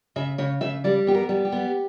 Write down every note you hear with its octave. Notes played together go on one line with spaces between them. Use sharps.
C#3 E5
C#3 C#5
C#3 E5
G3 D5
B3 G4
A#4
G3
G4
B3